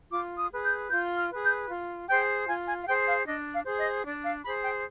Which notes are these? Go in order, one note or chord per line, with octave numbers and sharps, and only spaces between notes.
F4 D6
D#6
G#4 B4
G6
F4 G6
F6
G#4 B4
G6
F4
G#4 C5 G5
F4 G#5
G#5
F5
G#4 C5 G5
F5
D4 D#5
F5
G#4 C5
D#5
D4 D5
F5
G#4 C5 B5
G5